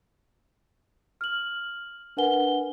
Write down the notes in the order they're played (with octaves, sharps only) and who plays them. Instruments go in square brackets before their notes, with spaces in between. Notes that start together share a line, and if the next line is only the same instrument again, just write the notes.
[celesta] F6 F#7
D4 A#4 B4 F#5 G#5 G7